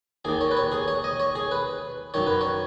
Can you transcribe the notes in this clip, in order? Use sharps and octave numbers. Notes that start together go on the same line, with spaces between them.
D#2 D#3 G#4
C#5
B4
C#5
G#4
C#5
D#5
C#5
G#4
B4
F#2 D#3 C#5
B4
C#5